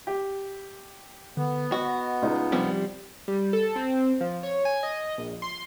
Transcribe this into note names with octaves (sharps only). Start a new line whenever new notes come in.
G4
D3 B3
F#4 D#5
C#2 D#4 F4
C3 F3 G3 G4
G3
A4
C4
F3
C#5
G#5
D#5
A#1
C6